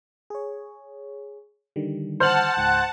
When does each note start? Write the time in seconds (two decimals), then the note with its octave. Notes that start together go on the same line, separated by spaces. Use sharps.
0.30 G#4 C#5
1.76 D3 D#3 G3
2.20 C5 F#5 A5 F6 F#7
2.57 C#2 G#2 G5 F#6